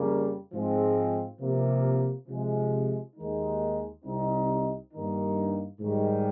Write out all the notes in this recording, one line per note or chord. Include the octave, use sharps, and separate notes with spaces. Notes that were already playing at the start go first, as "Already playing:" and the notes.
Already playing: F2 C#3 G3 A#3
G#2 F3 G#3 C4
C3 F3 A#3
C3 F3 G#3
D#2 D#3 G#3 D#4
C2 C3 G3 C4 D#4
G2 D#3 A#3 D#4
G#2 D#3 G3